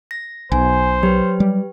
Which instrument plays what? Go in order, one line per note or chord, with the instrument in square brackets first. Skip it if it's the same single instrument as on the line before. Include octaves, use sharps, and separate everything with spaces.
[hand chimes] A#6
[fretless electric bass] B1 B2 [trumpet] C5 [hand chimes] G#5
[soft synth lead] F#3 [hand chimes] G4 B4
[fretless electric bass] G3